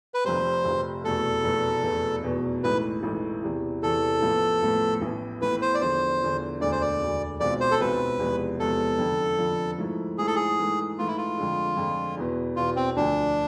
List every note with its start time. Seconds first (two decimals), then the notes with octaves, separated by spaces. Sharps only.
0.14 B4
0.24 F1 F2 C3 C5
0.65 F1 F2 C3
1.04 F1 E2 B2 A3 A4
1.44 F1 E2 B2 A3
1.83 F1 E2 B2 B3
2.23 F1 E2 B2 B3
2.64 A1 G#2 E3 A3 B4
3.03 A1 G#2 E3 A3
3.42 E2 C3 E3
3.83 E2 C3 E3 A4
4.22 A1 A2 F3 B3
4.63 A1 A2 F3 B3
5.01 A1 A2 E3 B3 E4
5.42 A1 A2 E3 B3 E4 B4
5.62 C5
5.75 D5
5.81 E2 D3 F3 C5
6.22 E2 D3 F3
6.60 E1 D2 D3 D5
6.72 C5
6.81 D5
7.00 E1 D2 D3
7.40 B1 B2 G#3 C4 F4 D5
7.61 C5
7.71 A4
7.79 B1 B2 G#3 C4 F4 B4
8.19 E2 C3 F3 G#3 B3
8.60 E2 C3 F3 G#3 B3 A4
8.99 F2 D3 F3
9.38 F2 D3 F3
9.78 G#2 F3 A3 E4
10.18 G#2 F3 A3 E4 G#4
10.27 A4
10.35 G#4
10.58 G#2 E3 A3
10.98 G#2 E3 A3 F4
11.07 E4
11.18 F4
11.38 F2 D3 G#3
11.77 F2 D3 G#3
12.17 E2 B2 B3 E4
12.56 E2 B2 B3 E4 F4
12.76 C4
12.96 D2 D3 F3 D4